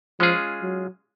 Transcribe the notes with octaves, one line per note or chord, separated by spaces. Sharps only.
F3 G#3 C#4 F4 G#4
F#3